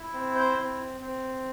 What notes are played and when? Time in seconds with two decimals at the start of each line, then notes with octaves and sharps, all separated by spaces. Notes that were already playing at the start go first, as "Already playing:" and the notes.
Already playing: E4
0.14 C4
0.35 C5
0.57 C4
1.01 C4